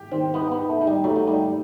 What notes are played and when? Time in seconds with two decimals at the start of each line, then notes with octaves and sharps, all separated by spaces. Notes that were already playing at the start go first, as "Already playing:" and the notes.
Already playing: G4
0.11 D#3 C4
0.34 B3 D#4
0.52 B3
0.58 D#4
0.69 A3
0.81 D#4
0.87 G3
1.04 F#3 A3
1.16 F#3
1.27 G3 D#4